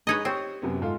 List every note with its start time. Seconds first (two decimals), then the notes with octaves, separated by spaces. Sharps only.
0.07 G#3 D#4 B4 C#5 D#5
0.25 C4 G4 C#5 C#6
0.62 F#2 C3 B3
0.82 G#2 F4 A4